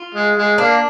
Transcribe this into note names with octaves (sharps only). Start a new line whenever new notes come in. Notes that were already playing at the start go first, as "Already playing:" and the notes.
Already playing: F4
G#3
G#3
A#3 D4